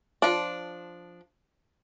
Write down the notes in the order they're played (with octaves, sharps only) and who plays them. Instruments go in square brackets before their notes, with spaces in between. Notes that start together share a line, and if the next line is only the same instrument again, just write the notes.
[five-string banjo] F3 D4